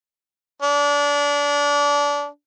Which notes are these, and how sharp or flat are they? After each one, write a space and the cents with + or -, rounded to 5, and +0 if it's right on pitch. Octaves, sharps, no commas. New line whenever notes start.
D4 -25